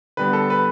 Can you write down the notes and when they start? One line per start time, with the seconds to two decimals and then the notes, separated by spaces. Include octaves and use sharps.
0.17 D3 G3 B3 B4
0.33 A4
0.50 B4